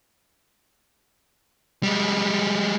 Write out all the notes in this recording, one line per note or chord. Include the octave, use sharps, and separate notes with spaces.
G3 G#3